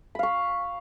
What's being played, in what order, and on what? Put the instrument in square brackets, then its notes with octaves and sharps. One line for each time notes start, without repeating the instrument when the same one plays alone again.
[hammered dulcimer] B5
F5
C#6